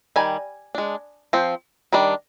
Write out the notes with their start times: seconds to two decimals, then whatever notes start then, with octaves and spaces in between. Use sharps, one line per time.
0.16 D#3 G3 G#5
0.75 G#3 D4
1.33 F3 C4
1.93 D#3 G3 D4